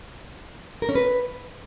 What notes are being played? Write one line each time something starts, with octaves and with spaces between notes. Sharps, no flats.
A#4
C#4
B4